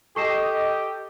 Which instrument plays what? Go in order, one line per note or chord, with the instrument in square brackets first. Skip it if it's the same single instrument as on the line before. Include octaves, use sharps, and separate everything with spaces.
[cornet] G4 [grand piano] A4 [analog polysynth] D#5 [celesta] C#6 C7 E7